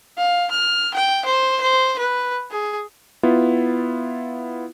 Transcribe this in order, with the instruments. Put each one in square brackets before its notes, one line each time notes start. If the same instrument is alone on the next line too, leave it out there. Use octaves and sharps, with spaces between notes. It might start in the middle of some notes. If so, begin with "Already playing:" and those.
[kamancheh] F5
F6
G5
C5
C5
B4
G#4
[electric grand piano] B3 E4 F4